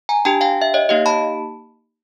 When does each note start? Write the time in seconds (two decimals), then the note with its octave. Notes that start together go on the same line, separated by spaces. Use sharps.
0.09 G#5 A#5
0.25 D4 G4 G5 A5
0.41 F5 G5
0.62 E5
0.74 C#5 D#5
0.89 A#3 D#4 G4 D#5 F5
1.06 A5 B5